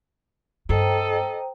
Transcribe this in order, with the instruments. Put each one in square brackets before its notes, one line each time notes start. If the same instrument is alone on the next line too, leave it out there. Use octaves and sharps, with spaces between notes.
[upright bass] G2 [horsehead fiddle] A4 D#5 [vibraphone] C5 G5 A#5